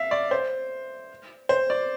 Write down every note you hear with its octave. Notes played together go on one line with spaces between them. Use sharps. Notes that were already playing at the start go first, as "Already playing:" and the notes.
Already playing: E5 F5
D5
C5
C5
D5